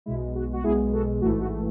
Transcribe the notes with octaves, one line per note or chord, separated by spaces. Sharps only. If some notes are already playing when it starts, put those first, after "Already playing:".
B1 B2 G#3 E4
F#4
F#4
B1 B2 G#3 E4 G#4
F#4 A4
A1 G#2 E3 A3 F#4
F#4